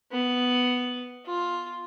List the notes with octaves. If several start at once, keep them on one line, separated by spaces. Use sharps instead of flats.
B3
F4